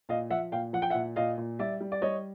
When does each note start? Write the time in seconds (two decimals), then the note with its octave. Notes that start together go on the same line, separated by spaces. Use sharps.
0.09 A#2 D#5 F5
0.30 F3 E5 F#5
0.52 A#2 F5 G5
0.73 F3 F#5
0.82 G5
0.90 E5 F#5
0.94 A#2
1.16 A#2 D#5 F5
1.38 A#2
1.59 G3 D5 E5
1.80 G3
1.92 D5
2.02 G3 C#5 D#5